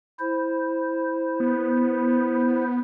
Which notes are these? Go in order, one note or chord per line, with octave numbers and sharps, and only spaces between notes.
E4 C5
B3